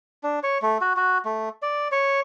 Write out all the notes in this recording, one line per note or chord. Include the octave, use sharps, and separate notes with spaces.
D4
C#5
A3
F#4
F#4
A3
D5
C#5